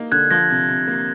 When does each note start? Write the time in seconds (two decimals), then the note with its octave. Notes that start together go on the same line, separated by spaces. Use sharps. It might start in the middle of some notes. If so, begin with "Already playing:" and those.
Already playing: A#3 D#4
0.12 D3 F#6 G#6
0.31 F3 G#6 A#6
0.50 C3
0.69 C3
0.88 A#3